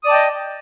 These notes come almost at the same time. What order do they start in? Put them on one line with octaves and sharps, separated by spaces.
D#6 D5 A5 G5 D#5